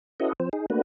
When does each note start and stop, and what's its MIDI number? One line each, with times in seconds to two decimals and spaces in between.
0.20 0.33 61
0.20 0.33 64
0.20 0.33 66
0.20 0.33 69
0.20 0.33 71
0.20 0.33 75
0.40 0.49 53
0.40 0.49 60
0.40 0.49 72
0.53 0.66 63
0.53 0.66 68
0.70 0.81 57
0.70 0.81 58
0.70 0.81 62
0.70 0.81 66
0.70 0.81 71